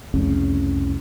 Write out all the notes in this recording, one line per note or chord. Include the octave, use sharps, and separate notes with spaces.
C2 F2 A2 C#3